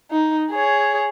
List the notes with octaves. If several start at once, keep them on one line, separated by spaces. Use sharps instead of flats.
D#4
G#4 C#5